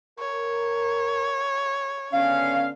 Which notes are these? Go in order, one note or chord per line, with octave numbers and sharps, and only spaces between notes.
A#4 C#5
D3 B3 C#4 D4 F5